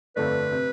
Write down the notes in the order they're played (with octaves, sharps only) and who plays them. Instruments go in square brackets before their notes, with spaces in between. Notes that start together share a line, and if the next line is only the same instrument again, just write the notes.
[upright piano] G1 F2 D3 A3 D4 [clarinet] B4
[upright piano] C3